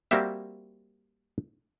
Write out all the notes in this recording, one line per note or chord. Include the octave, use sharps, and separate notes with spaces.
G3 A#3 C4 F#4 G4 E5